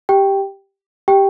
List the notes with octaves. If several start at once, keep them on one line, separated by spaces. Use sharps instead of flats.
G4 G5
G4 G5